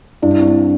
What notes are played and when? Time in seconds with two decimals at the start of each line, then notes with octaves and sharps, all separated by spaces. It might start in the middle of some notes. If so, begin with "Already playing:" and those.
0.22 G2 E4
0.31 D4
0.40 C4
0.48 D4